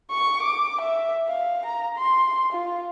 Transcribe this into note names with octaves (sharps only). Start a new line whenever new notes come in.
C#6
D6
E5
F5
A#5
C6
F4